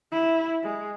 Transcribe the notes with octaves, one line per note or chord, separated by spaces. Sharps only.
E4
G#3